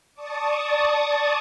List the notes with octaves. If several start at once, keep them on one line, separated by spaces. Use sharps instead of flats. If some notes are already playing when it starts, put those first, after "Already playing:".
D5 A5 C#6 D#6